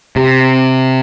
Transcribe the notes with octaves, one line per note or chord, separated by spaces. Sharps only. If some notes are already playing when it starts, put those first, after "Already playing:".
C3